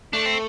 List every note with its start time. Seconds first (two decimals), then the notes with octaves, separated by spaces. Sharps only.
0.13 A3 D4
0.26 C4